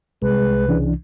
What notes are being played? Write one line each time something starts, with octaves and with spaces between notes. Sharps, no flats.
C2 G#3 B4
C#3 E3 D4